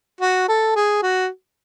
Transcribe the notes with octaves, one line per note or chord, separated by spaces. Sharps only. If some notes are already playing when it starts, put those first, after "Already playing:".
F#4
A4
G#4
F#4